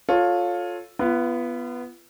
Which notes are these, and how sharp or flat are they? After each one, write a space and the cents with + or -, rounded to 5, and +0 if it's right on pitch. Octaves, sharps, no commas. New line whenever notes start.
F4 +15 A4 +0 C#5 +0
B3 +0 F4 -40 B4 +0